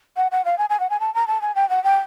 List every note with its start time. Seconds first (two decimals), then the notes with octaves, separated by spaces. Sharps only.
0.17 F#5
0.31 F#5
0.45 F5
0.58 G#5
0.70 G#5
0.80 F#5
0.90 G#5
1.00 A5
1.14 A#5
1.27 A5
1.42 G#5
1.55 G5
1.69 F#5
1.84 G5